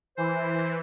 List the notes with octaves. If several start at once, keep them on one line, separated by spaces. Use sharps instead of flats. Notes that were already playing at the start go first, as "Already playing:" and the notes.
E3 C5